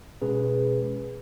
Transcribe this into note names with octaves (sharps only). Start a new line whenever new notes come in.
B2 G#3 C#4 G#4 B4